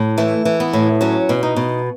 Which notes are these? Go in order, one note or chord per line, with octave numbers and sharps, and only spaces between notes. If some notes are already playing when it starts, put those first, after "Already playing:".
Already playing: A2
E3 A3
E3
B3
A2
F#3 C#4
B2
D#4
B2